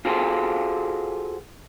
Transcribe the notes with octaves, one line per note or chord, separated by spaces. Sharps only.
F4 F#4 G#4 A4 C5